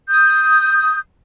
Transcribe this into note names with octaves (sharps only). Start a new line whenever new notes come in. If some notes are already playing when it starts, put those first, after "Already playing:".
D#6 G6